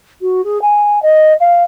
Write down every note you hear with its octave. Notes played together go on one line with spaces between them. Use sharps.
F#4
G#4
G#5
D#5
F5